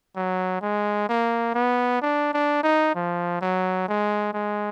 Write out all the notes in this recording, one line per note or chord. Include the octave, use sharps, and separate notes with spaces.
F#3
G#3
A#3
B3
D4
D4
D#4
F3
F#3
G#3
G#3